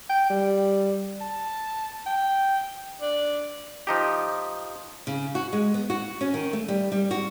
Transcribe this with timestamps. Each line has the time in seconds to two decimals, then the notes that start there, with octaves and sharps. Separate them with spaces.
0.10 G5
0.30 G3
1.21 A5
2.06 G5
3.01 D4
3.87 F3 D#4 G4
5.07 C#3
5.35 F#4
5.53 G#3
5.74 B3
5.90 F#4
6.21 C#4
6.34 D#3
6.53 A3
6.68 G3
6.92 G3
7.11 F#4